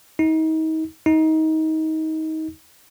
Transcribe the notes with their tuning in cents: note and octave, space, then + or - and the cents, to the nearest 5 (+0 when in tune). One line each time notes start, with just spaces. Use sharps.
D#4 +35
D#4 +25